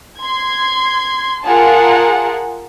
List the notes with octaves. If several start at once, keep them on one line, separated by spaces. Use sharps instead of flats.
C6 G#6
F4 G#4 A#4 F#5 A5